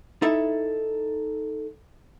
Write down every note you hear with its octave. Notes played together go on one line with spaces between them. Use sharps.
D#4 E4 A4 E5